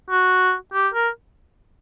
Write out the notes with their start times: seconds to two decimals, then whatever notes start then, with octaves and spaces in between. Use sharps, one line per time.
0.10 F#4
0.74 G4
0.94 A#4